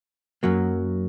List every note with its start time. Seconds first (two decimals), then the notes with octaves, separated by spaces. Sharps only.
0.43 F#2 F#3 A#3